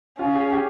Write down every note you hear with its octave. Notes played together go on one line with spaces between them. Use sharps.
C#4 F4
G#4
G4